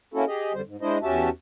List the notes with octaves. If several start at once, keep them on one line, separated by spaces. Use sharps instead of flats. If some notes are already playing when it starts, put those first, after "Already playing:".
A#3 C#4 E4 F#4 A4
G4 G#4 D#5
F2 D3 G3 C5
G#2
G#3 D4 E4 C5 D#5
E2 C#4 F#4 G4 E5 A5